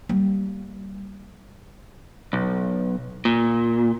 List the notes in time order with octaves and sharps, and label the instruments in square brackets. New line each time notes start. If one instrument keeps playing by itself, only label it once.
[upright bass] G3 A#3
[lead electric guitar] B1
A#2